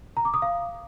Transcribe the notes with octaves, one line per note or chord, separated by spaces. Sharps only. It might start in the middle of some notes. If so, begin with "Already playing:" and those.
A#5
D6
D#6
F5